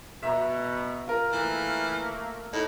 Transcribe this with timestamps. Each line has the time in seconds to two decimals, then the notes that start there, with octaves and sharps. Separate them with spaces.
0.23 B2 E5 A#5
1.07 F4 A#4
1.32 E3 A3 A#3
2.53 A2 D#4